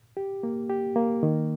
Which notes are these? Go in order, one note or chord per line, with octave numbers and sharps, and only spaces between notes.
G4
A#3
G4
A#3
D#3